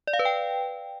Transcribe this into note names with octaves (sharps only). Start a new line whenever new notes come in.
D5
F5
B4
G5